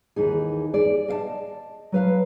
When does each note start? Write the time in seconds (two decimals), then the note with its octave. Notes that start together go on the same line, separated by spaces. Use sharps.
0.16 D#2 E3 D#4 G#4
0.74 G#4 D5
1.08 D#5 F5 A5
1.92 F#3 B4 F5